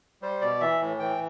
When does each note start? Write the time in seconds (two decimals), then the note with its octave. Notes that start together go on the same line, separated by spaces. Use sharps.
0.22 G3 C5
0.41 B2 D5
0.60 E3 E5
0.81 A2
0.99 E3 G5